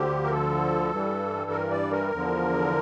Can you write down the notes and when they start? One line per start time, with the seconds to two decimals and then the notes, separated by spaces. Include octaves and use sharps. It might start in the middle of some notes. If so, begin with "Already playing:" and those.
Already playing: D2 D3 F3 G4
0.24 A#4
0.31 A4
0.91 G2 E3 G3
1.51 A#4
1.71 D5
1.91 A#4
2.11 E2 D3 F3